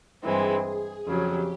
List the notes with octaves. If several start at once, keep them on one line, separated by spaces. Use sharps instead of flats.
G2 E3 G#3 C4 G#4
F2 C#3 F#3 G4